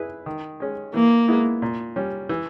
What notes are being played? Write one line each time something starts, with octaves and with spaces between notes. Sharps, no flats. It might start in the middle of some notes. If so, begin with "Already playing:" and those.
Already playing: E4 G#4 B4
D#3
G#3 C#4
E3 A#3
G#3 B3 E4
A#2
G3 C#4
E3